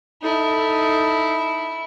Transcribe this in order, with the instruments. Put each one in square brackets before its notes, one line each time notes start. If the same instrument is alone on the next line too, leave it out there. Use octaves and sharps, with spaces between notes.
[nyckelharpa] D#4 A4 [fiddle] E4